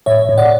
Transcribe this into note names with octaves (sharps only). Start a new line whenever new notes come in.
A2 C#5 E5
A2
D5 F#5